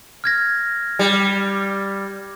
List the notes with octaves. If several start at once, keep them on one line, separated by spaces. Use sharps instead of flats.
F6 G#6 A#6
G3